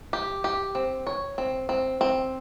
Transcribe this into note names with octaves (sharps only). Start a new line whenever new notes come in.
G4
G4
C4
C#5
C4
C4
C4